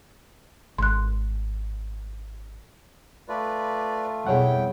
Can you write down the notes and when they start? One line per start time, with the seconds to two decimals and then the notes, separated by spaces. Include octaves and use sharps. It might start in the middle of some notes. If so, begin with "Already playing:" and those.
0.78 G#1 C6 F#6
3.28 A3 F4 B4 D5
4.27 B1 F2 G3 E4 G#4 C#5 F#5 G5